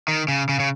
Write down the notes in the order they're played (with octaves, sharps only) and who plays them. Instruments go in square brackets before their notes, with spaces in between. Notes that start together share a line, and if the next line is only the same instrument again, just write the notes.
[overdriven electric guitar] D#3
C#3
C#3
C#3